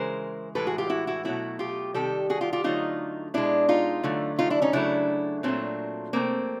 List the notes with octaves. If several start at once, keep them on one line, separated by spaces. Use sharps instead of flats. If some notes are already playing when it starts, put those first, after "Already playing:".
Already playing: C#3 E3 G#3 A#4 C5
A2 E3 G#3 A4 B4
F#4 G#4
F4 G4
E4 F#4
E4 F#4
B2 F#3 A3 E4 F#4
F4 G4
C3 D#3 G3 G4 A4
F#4 G#4
F4 G4
F4 G4
D3 F#3 A3 D#4 F4
B2 G#3 D4 E4
D#4 F4
D3 F#3 A3
D#4 F4
D4 E4
C#4 D#4
C#3 F#3 A3 D4 E4
A#2 F#3 A3 C4 D4
C3 F3 A3 A#3 C4